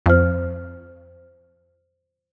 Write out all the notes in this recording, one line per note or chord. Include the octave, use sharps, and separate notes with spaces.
F2 C5 F6